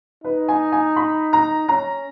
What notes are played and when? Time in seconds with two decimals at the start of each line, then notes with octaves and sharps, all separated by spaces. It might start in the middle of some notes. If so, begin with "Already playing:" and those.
0.24 D#4 B4
0.48 G#5
0.72 G#5
0.96 B5
1.33 A#5
1.69 C#4 A#5